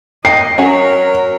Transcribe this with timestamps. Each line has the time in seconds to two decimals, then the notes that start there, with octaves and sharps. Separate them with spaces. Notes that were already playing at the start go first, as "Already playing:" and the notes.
0.25 D#5 G5 C7
0.58 F#3 C#4 F#4 A#4 F#5